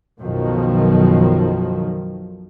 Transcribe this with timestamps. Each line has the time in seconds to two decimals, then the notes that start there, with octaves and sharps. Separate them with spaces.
0.20 B1 F#2 B2 D#3 F3